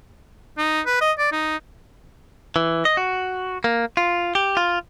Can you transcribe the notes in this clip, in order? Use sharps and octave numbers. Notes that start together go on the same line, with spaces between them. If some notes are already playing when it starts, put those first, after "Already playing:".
D#4
B4
D#5
D5
D#4
E3
D#5
F#4
A#3
F4
G4
F4